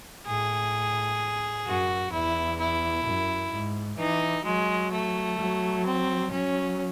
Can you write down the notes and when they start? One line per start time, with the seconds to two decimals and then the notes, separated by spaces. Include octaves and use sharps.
0.26 A2 G#4
1.66 F#2 F#4
2.12 E2 E4
2.60 E4
3.05 F#2
3.52 G#2
3.99 E3 D#4
4.45 F#3 G#3
4.93 A3
5.39 F#3
5.86 C4
6.31 F#3 C#4